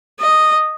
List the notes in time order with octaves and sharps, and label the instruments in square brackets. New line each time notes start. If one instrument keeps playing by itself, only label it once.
[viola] D#5